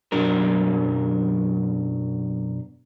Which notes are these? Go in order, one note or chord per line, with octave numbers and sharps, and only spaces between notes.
F#2 B2 F#3 D4 A#4